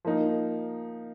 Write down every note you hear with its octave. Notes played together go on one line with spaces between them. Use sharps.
F3 A#3 D#4